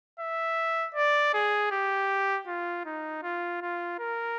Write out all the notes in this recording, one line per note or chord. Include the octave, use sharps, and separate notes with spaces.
E5
D5
G#4
G4
F4
D#4
F4
F4
A#4